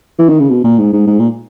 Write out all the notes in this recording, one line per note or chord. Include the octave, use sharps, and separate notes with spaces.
E3
D#3
C#3
B2
A#2
G#2
G#2
G#2
A#2